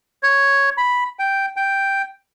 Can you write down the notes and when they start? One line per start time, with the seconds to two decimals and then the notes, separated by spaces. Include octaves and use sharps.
0.23 C#5
0.78 B5
1.19 G5
1.56 G5